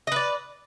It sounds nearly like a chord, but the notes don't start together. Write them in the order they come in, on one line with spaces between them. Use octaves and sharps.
D#5 B4 D5